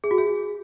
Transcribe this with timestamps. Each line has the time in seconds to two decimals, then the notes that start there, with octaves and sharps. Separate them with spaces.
0.04 G#4
0.11 F#4
0.18 G#4